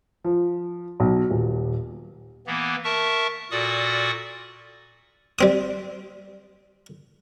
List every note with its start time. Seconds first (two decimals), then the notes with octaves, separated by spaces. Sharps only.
0.24 F3
1.00 B1
1.31 D#1
2.47 E3 A#3 B3
2.84 A#4 E5 A5 C#6
3.51 A#2 F#4 A4 D5 C#6 D#6
5.39 G3 C4 D#6